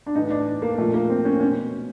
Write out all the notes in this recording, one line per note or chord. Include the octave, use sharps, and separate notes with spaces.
D4
A2 E3 D#4
D4
A#3
A#2 F3 A3
A#3
C4
C#4
B2 C#4